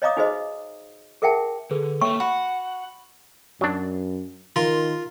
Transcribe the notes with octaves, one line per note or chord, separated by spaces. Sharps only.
C#5 D#5 F5 A#5 D6 D#6
D#4 F#4 G#4 B4 C5 D#5
G#4 A#4 E5 F#5 G5 A5
D3 G#4 A4 B4
A#3 A4 C#5 E5 G5 C#6
F#4 F#5 B5
F#2 F#3 D4
D#3 F4 A#4 C6